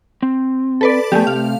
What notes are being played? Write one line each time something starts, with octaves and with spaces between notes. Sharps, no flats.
C4
A4 B4 D5
F3 A3 B3 G4 G#5
C3 F5